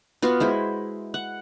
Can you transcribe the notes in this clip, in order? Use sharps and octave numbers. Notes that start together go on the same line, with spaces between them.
B3 F4 F#4 F5
G#3 E4 C5
F#5